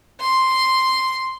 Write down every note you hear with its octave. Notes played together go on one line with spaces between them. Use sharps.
C6